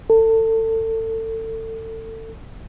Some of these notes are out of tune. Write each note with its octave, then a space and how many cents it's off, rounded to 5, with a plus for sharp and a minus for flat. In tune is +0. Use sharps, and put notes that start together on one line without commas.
A4 +30